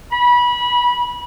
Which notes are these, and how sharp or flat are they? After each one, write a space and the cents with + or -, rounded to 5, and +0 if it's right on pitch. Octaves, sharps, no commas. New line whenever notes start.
B5 -25